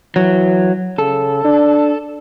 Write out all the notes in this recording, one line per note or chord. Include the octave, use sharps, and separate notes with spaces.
E3 F#3
C#3 A4
D4